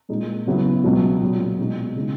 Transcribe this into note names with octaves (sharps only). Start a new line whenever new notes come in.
A#2 G#3 D#4
C#3 F#3 B3 E4
C#2 B2 F#3
A#2 F#3 C#4
B2 G#3 D#4
C#3 G#3 D#4